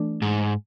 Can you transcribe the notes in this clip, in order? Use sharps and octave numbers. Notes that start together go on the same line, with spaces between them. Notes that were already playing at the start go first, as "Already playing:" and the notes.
Already playing: E3 A3 D4
G#2